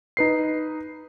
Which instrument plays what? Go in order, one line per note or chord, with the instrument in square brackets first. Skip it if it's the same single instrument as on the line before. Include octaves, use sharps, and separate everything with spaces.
[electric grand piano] D#4 B4 C7